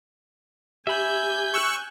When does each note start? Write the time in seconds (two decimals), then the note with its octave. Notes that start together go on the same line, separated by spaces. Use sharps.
0.87 G4 E5 G#5 B5 G6 G#6
1.54 C#6 E6 F#6